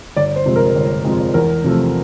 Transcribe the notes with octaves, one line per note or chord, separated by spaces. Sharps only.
G1 D5
C5
F2 C3 F3 G#3
A#4
G1
F2 C3 F3 G#3
E2 A#4
C3 F3 A3